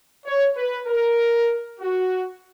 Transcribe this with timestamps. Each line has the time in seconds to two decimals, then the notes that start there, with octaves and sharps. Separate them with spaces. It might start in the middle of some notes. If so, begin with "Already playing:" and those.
0.26 C#5
0.57 B4
0.87 A#4
1.80 F#4